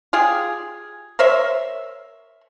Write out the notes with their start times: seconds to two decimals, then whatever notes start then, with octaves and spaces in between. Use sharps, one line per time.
0.13 F4 G4 G#4
1.19 A#4 C5 C#5 E5